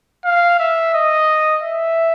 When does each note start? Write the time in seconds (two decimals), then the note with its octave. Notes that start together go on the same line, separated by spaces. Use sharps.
0.25 F5
0.59 E5
0.94 D#5
1.62 E5